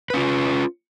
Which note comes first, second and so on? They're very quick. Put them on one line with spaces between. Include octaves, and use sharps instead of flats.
B4 C#4 F4